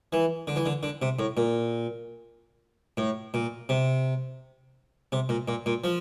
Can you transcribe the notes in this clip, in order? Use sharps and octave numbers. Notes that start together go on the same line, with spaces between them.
E3
D3
E3
D3
D3
C3
A2
A#2
A2
A#2
C3
C3
A#2
A#2
A#2
F3